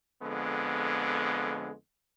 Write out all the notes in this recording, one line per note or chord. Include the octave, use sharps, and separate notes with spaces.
F2 D3 G#3 B3